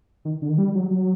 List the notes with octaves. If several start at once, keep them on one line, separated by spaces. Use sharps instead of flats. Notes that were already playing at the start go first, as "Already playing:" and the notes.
D#3
D3
D#3
G3
F#3
F#3